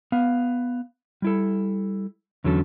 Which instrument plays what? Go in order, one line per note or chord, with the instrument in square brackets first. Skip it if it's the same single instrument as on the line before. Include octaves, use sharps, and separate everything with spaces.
[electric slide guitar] B3 F5
G3 E4 A4
E2 D3 F#3 C#4 A4